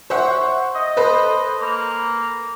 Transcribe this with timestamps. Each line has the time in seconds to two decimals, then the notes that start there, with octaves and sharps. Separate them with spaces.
0.10 C5 C#5 E5 F#5
0.75 D#5
0.97 A4 B4 C5
1.61 A#3